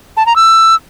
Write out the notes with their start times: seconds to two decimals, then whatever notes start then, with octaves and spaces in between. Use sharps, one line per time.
0.17 A5
0.26 A#5
0.36 E6